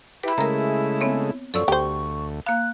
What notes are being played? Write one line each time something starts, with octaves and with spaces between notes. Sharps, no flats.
E4 G4 B4 B5
C#3 G#3 A3 A#4 A#5
B3 C4 C#5
F#2 F3 A4 D5 C#6 E6
D2 G4 C5
A#3 F5 F#6